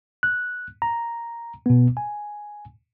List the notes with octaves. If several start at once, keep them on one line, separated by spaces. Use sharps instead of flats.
F#6
A#5
B2 B3
G#5